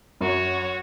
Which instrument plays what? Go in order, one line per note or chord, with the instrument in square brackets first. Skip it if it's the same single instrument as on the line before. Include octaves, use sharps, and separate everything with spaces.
[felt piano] F#2 [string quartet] F#4 C#5